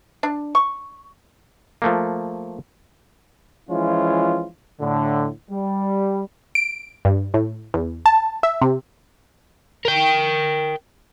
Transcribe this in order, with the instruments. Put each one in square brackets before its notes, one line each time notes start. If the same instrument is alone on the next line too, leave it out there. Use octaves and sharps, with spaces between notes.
[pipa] D4
C#6
[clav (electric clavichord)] F3 A3 A#3
[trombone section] E3 F3 G#3 C#4 E4 F4
A2 D3
G3
[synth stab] D7
G2
A2
E2
A5
E5
C3
[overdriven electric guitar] A#4 G5